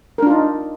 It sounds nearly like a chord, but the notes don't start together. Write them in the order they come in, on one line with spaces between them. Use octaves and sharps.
A#4 D4 F4 D#4